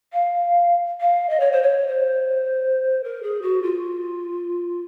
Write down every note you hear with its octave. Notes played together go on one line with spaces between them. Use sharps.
F5
F5
D#5
C#5
C5
C#5
C5
A#4
G#4
F#4
F4